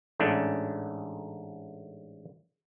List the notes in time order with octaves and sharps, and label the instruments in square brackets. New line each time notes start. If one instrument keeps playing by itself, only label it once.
[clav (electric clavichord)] A1 G#2 A3 C#4 D4